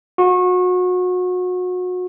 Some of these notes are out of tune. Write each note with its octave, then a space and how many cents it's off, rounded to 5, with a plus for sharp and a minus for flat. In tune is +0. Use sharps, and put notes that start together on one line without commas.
F#4 -30